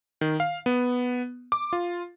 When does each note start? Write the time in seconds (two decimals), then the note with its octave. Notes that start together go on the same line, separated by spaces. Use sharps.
0.21 D#3
0.40 F5
0.66 B3
1.52 D6
1.73 F4